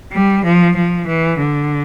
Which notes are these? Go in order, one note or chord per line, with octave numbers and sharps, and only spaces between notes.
G3
F3
F3
E3
D3